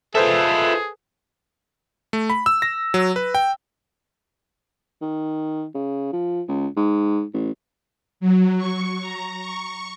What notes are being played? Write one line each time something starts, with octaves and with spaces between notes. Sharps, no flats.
F4 G#4 A4 B4 C5 E5
A3
B5
E6
A#6
F#3
B4
G5
D#3
C#3
F3
C#2
G#2
A1
F#3
C#6
A#5
C#6